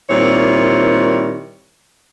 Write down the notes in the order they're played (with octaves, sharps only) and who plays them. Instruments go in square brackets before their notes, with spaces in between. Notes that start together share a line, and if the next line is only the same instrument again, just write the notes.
[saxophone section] A#2 D#3 G3 C4 E4 C#5